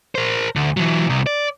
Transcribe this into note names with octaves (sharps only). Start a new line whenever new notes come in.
A#4 C5
D2
E3 F#3
C2
D5